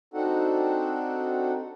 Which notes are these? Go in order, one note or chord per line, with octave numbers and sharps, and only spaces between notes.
C4 D4 D#4 F#4 A4 F#5